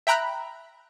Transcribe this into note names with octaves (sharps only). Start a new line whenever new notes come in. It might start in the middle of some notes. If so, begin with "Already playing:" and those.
E5 G5 A#5 B5 F#6